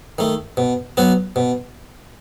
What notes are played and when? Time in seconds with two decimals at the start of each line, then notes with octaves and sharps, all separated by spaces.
0.18 D#3 A3
0.57 B2
0.97 F#3 B3 F#4
1.36 B2